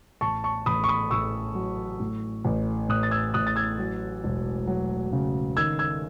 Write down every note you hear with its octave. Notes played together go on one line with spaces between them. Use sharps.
A1 A5 C#6
A5 C#6
A1 B5 D#6
C#6
B5 D#6
A1 C#6 E6
F#3
A2
A1
A2 D#6 F#6
A6
E6 G#6
A1 D#6 F#6
A6
E6 G#6
F#3
E1
F#3
C#3
D#3 E6 G#6
E6 G#6